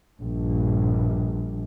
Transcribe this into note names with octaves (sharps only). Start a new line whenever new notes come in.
A#1 G2